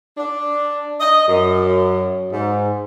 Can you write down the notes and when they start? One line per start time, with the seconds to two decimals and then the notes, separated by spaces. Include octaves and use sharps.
0.17 D4
1.00 D#5
1.28 F#2
2.33 G#2